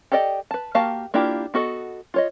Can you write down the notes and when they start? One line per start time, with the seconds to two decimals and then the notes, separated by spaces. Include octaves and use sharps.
0.12 G4 A4 D5 D#5 G5
0.51 B4 A5
0.75 A#3 F#4 G4 F5 A5
1.14 A#3 D4 E4 F4 G4
1.54 B3 F#4 A4 D#5
2.14 F4 C#5 D#5